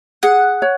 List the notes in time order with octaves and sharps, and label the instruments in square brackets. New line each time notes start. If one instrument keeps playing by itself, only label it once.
[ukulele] G#4 [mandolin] F#5
[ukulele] C#5